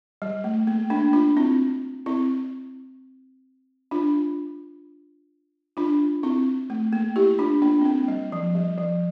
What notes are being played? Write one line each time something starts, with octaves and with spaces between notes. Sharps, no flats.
G3
A3
A#3
A#3 D4
D4 F4
C4 E4
C4 E4
D4 F4
D4 F4
C4 E4
A3
A#3
E4 G4
D4 F4
A#3 D4
C4
A#3
G3
F3
G3
F3